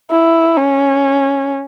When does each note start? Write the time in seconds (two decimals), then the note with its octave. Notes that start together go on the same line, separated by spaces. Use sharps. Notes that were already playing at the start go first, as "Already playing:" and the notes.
0.11 E4
0.57 C#4